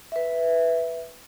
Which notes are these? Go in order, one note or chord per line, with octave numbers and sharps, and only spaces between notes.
B4 E5